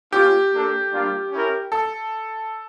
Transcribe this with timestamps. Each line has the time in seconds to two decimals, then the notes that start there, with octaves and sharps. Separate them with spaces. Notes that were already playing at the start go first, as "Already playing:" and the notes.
0.12 A#3 C#4 F4 G4
0.53 A#3 D4 A4
0.93 G3 A#3 D4 F4
1.31 C#4 E4 A#4
1.72 A4